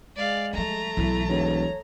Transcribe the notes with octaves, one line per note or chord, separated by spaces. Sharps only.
G#3 D5 F5
F3 G3 A3 A#5
B1 E3 E4
E1 C#5